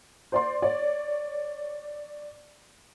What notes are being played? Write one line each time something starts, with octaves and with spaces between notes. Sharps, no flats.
C5 D5 C6
C#5 D5